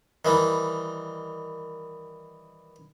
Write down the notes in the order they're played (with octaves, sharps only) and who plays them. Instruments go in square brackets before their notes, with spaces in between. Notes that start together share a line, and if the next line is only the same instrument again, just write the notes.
[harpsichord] D#3 E3 G3